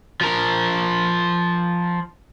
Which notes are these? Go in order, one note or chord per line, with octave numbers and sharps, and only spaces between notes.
F3 A#4